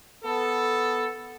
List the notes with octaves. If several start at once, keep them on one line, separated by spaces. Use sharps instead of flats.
B3 A4